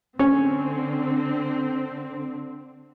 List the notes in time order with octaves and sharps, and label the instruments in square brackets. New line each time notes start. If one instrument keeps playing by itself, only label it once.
[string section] D3 C4 [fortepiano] C#4